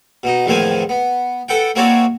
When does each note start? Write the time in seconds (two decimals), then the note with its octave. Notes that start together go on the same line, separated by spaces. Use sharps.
0.23 B2 D#4
0.46 E2 A2 D#3 F3 C4 G#5
0.89 B3
1.48 A4 B4 F#5 G5
1.75 A#3 C4 E4 F#4 C#5 D5